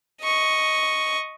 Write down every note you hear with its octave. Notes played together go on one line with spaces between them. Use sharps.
D#5 C#6